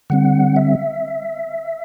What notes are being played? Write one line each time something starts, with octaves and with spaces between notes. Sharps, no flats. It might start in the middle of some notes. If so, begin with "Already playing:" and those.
D3 G3 C4 F#5
E5